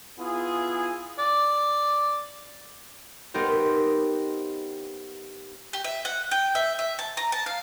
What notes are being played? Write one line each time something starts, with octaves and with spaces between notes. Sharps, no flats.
B3 E4 F4 G#4
D5
B3 D#4 G4 A#4 C5
G4
E5
F#5
G5
E5
E5
A5
A#5
A5
F5